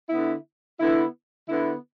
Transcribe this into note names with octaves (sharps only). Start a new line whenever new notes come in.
D3 B3 E4
D3 B3 E4
D3 B3 E4